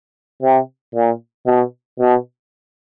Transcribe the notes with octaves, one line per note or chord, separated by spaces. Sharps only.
C3
A#2
B2
B2